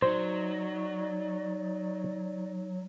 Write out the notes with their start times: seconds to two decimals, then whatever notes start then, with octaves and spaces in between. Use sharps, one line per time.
0.02 F#3 D#4 C5 D5